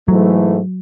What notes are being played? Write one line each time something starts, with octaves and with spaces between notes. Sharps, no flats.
G#2 E3 F#3 A3